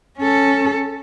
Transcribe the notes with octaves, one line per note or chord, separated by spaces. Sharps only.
C#4 A4